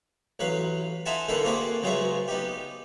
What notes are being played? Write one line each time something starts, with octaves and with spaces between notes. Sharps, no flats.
A1 F#3 B4 F5
D#4 F4 E5 F#5 G#5 A5
D3 A#3 D#4 E4 A4 B4
A#3 C4 F4 F#4 G#4 B4
C#2 F#3 F4 G#4 E5 C#6
B3 D#4 G4